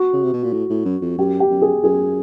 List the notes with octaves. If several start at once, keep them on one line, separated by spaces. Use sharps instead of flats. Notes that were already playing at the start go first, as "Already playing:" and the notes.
Already playing: F#4
C#3
C3
B2
A#2
A2
A2
F#2
F2
F#2 G4
G4
F#2
G#4
F#2 G#4